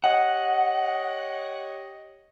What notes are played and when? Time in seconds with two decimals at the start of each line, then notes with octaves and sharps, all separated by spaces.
0.04 G4 C#5 D#5 F#5